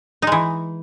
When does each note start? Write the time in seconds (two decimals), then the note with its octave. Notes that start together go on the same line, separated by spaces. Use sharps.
0.22 D#4
0.27 G#3
0.32 E3